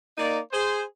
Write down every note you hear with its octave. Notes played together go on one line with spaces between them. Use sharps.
A#3 D#4 D5
G#4 C5